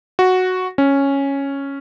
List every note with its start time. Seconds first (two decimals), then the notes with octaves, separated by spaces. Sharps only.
0.19 F#4
0.78 C#4